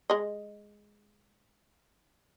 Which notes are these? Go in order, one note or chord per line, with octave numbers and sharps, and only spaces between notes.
G#3 D#5